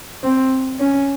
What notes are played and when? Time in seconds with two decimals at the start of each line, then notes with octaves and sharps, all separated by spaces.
0.24 C4
0.80 C#4